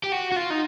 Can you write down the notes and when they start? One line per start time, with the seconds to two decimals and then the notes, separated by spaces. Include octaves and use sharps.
0.04 G4
0.12 F#4
0.32 F#4
0.36 F4
0.50 D#4